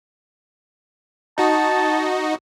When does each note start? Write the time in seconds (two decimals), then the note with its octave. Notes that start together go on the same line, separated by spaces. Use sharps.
1.38 D#4 F#4 D#5 A5